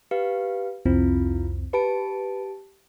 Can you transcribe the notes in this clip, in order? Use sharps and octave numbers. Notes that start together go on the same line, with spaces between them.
G4 B4 F5
C2 F2 C4 E4 F4
G4 B4 A5 D7